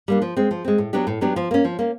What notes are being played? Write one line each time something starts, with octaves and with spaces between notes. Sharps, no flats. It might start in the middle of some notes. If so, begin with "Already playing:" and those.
G3 A#3 D4
F3
G#3 C4
F3
G#3 C4
A2
F#3 B3 D4 G4
A2
F#3 B3 D4 G4
F3
A#3 C#4
F3
A#3 C#4